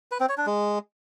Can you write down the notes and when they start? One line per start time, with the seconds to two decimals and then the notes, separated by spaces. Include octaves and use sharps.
0.12 B4
0.20 C4
0.29 C#5
0.38 D4
0.46 G#3